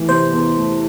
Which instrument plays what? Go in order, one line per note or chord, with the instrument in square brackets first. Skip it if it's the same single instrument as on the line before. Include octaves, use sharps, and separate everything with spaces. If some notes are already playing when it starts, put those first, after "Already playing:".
Already playing: [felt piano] E3 A3
[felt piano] C3 [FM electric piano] C5
[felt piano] E2
A3